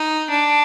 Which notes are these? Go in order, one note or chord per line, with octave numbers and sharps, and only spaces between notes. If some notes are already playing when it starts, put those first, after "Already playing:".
Already playing: D#4
D4